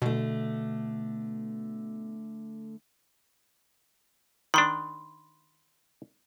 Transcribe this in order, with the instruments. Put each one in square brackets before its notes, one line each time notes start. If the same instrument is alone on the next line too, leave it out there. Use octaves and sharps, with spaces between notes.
[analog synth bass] B2 [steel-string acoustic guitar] D3 A3
[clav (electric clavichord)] D#3 D4 [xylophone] B5 C6